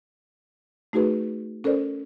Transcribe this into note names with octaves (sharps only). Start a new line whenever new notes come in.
A3 D#4 F#4 G#4 B4
C#4 A4 A#4 C5 D5